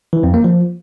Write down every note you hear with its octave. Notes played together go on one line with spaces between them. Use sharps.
E3
F2
A#3
F3